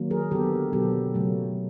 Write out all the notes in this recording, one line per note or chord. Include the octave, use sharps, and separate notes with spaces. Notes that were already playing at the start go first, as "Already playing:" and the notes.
Already playing: D#3 F#3 A#3
G#4 A#4
D3 F#3 B3 G4 A4
B2 F#3 B3 G4 A4
C#3 F#3 A3